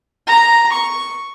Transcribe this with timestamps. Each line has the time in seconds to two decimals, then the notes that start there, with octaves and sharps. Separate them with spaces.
0.27 A#5
0.72 C#6